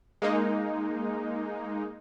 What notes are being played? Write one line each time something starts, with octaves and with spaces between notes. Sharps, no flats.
G#3 A#3 D#4